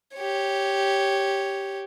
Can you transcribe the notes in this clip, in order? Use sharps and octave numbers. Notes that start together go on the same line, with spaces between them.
G4 C#5